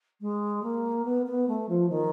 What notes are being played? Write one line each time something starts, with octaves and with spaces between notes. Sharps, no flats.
G#3
A#3
B3
B3
A3
F3
D#3